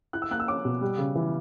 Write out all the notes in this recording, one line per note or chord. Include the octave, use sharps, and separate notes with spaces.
E4 F#6
E6
A#3 F#6
E6
C#4 D6
B2
G3
C#3
E3